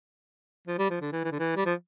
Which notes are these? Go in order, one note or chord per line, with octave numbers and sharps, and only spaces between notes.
F3
G3
F3
D3
E3
E3
D3
E3
G3
F3